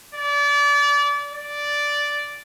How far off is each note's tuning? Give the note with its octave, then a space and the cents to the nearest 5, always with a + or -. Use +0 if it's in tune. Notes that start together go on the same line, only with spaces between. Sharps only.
D5 -30
D5 -5